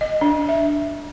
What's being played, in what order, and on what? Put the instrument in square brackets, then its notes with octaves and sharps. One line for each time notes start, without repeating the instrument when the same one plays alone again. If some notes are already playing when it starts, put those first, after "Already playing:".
[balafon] D#5
D4
E5